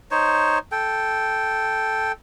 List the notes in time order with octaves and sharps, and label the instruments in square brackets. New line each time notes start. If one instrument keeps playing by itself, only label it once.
[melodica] D#4 C5 C#5
A4 G5